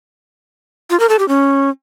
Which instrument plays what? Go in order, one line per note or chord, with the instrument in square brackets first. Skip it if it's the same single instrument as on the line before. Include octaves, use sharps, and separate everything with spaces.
[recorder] F4
A#4
A4
G4
C#4